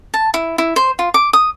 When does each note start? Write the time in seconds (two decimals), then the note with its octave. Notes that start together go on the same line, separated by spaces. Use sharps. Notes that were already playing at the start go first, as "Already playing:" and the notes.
0.14 A5
0.34 E4
0.58 E4
0.76 C5
0.99 F4
1.14 D6
1.33 D#6